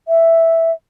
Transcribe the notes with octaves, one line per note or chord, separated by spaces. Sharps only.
E5